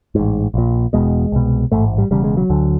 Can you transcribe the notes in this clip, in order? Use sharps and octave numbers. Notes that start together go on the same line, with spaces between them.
A1 G#2
A#1 A#2
E1 E2 B2 G#3
C2 B2
A1 G#2 A3
G3
E1 E2 C#3 G3
G#3
F#3
D2 D3